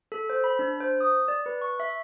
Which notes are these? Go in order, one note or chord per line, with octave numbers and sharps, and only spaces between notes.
A4
C5
B5
D4
C5
D#6
D5
B4
C#6
E5